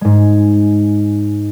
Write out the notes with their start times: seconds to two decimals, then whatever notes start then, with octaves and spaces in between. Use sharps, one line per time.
0.01 G#2 G#3